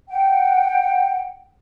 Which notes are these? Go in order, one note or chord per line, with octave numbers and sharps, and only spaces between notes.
F#5 G5